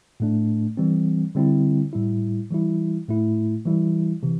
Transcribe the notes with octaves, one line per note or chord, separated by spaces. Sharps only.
A2 A3 D4
E3 G3 C4
D3 G3 C4 E4
A2 G3 E4
E3 G3 E4
A2 A3 E4
E3 G3 E4
C3 E3